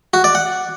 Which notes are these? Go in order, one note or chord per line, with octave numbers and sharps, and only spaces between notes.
F#4
D5
F#5